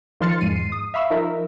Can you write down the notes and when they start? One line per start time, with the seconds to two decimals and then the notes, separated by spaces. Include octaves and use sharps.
0.20 D#3 F3 C6 F6 A6 C#7
0.41 E2 G#2 G#3 C7 D#7
0.72 D#6
0.94 E5 F5 B5 C#6 E6
1.10 F3 D#4 A#4 E5